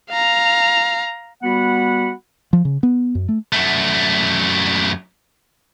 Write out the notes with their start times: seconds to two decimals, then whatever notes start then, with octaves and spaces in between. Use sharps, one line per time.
0.10 F5 A#5
1.43 G3 B3 F#4 F#5 B5
2.53 F3
2.65 C#3
2.83 B3
3.15 F#2
3.29 A3
3.53 F#2 A3